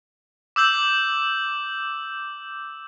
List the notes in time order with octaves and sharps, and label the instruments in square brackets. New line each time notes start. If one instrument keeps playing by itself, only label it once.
[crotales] D6 E6 G6 F#7